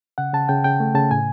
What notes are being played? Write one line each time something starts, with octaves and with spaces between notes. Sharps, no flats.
C#3 F#5
C#3 A5
C#3 G5
C#3 G5
A3
C#3 A5
A2 G#5